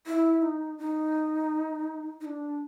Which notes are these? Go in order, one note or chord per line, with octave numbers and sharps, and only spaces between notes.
E4
D#4
D#4
D#4
D4